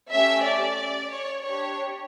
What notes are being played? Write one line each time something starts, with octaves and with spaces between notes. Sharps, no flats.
A3 C#4 G4 E5
D5
C#5
D4 G4 C#5